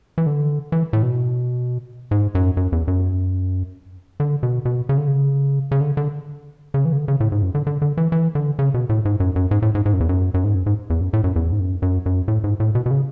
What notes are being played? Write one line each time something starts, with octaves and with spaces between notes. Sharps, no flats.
E3
D3
E3
A2
B2
G#2
F#2
F#2
E2
F#2
D3
B2
B2
C#3
D3
C#3
C#3
D3
D3
C#3
E3
C#3
D3
C#3
A2
G#2
F#2
D3
D3
D3
E3
E3
D3
C#3
B2
A2
G#2
F#2
F#2
G#2
A2
G#2
G#2
F#2
E2
F#2
F#2
G#2
F#2
G#2
E2
F#2
A2
F#2
E2
G#2
F#2
F#2
F#2
A2
G#2
A2
B2
B2
C#3